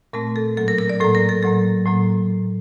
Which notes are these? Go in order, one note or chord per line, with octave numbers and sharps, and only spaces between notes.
A#2 A3 C4 A#4
A4
A2 F#3 A#3 A4
A#4
A#4
D5
A2 F#3 A#3 A4
A#4
A4
A2 F#3 A#3 A4
A2 F#3 A#3